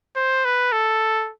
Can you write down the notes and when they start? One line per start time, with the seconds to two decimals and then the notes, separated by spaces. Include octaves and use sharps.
0.16 C5
0.45 B4
0.72 A4